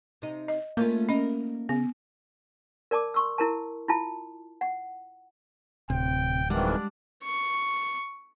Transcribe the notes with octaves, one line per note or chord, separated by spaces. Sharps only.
C3 D#4
D#5
A3 A#3 C#4 F4 A#4
C#4 A#4 D#5
C#3 B3
A#4 D5 A5 D6
C6 C#6 E6
E4 A#4 A5
E4 F4 A5
F#5
D1 C3 G5
F2 D#3 E3 G3 G#3 D4 F#5
C#6